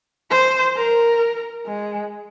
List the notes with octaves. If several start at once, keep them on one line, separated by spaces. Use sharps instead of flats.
C5
A#4
G#3